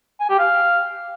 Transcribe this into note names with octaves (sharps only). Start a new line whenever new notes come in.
G#5
G4
F5